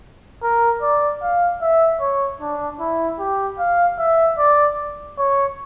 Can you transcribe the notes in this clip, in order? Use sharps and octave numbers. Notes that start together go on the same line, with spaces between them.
A#4
D5
F5
E5
C#5
D4
E4
G4
F5
E5
D5
C#5